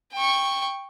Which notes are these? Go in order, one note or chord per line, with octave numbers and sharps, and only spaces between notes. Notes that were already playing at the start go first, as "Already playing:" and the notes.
G5 C#6